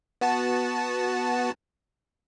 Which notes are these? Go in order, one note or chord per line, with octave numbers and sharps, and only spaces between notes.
B3 F#4 A5